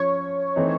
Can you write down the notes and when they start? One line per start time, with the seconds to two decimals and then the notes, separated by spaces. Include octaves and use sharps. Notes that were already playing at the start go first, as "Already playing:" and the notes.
Already playing: F3 C#4 C#5
0.56 E3 A3 C4 D#4